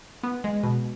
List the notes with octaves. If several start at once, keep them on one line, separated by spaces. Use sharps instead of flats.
B3
G#3
B2